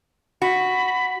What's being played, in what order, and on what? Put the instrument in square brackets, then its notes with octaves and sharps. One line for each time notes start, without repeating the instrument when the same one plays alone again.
[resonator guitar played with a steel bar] F#4 [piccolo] B5